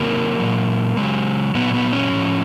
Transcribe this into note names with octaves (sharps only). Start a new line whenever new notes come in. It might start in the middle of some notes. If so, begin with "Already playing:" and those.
Already playing: C3 D#3 F#3 A#3
A#2 F#3
C#3 F#3 G#3
A#2 F#3 B3
B3
C#4
A2 F3